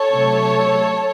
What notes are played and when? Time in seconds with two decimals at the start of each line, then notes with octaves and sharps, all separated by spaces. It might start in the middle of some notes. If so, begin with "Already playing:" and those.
Already playing: A4 C#5
0.11 C3 F#3 A3